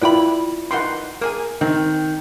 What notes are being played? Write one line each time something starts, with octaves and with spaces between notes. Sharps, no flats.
E4 F4 B4 D5 G5 B5
D#3 E3 G3 F#5 C6
A#3 G#4 A#4 G#5
D#3 C4